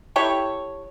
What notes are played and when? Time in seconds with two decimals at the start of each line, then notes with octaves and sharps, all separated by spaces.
0.16 E4 G4 A4 C#5